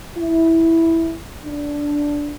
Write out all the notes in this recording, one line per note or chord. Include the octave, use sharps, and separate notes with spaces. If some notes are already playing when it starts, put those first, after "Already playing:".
E4
D4